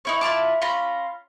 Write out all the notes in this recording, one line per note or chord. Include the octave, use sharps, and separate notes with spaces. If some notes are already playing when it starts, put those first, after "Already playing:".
D#4 E4 C#5
E4 F4 A5 D6
C#4 F4 A#5 B5